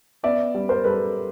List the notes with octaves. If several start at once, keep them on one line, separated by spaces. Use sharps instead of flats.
B3 D5 E5
G3
A#4 C5
G3 A4 B4